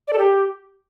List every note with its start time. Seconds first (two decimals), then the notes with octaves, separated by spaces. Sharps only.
0.08 D5
0.13 A4
0.18 G4